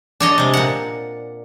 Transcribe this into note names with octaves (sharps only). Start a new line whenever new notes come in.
D4 C#5 D#5
C3 G#3
A#2 F#5